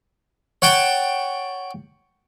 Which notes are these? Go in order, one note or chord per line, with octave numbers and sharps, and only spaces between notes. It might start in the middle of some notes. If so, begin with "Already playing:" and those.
C#5 F#5 G5 A5